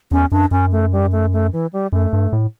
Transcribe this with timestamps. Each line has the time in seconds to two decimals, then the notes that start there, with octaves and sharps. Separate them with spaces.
0.11 E2 C#4
0.32 F#2 D4
0.51 F#2 C#4
0.72 A3
0.92 G3
1.12 A3
1.33 A3
1.53 E3
1.73 G3
1.92 F#2 A3
2.13 G2
2.33 A2